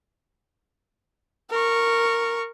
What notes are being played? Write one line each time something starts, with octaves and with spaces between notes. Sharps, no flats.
A#4 C#6